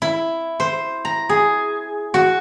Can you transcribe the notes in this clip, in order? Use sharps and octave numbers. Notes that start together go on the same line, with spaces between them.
E4
C5
A#5
G#4
F#4